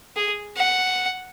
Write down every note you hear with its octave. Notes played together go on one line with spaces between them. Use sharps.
G#4
F#5